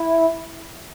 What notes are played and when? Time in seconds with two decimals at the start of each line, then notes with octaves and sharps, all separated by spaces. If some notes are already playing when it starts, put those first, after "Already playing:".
Already playing: E4